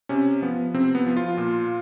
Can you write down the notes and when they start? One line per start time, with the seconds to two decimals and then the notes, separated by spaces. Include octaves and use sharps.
0.09 C3 C#4
0.42 F3 B3
0.74 C3 C4
0.95 B3
1.06 F3
1.17 F4
1.37 A#2